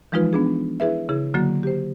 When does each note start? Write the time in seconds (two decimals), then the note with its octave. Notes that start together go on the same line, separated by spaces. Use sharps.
0.12 E3 F3 G#3 D#4 F4 B4
0.33 B3 D4 G#4
0.80 E4 G#4 B4 E5
1.09 C#3 E4 G#4
1.34 D3 F#3 A#3 F#4
1.63 G4 C5